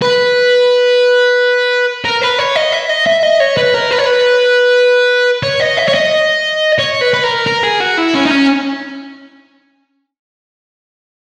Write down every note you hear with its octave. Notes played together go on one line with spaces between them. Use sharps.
B4
A#4
B4
C#5
D#5
E5
D#5
E5
D#5
C#5
B4
A#4
B4
C#5
B4
C#5
D#5
E5
C#5
D#5
C#5
B4
B4
A#4
A#4
G#4
F#4
E4
C#4
D#4
C#4